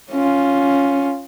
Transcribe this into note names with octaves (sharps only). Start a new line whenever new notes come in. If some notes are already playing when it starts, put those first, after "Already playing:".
C#4 F4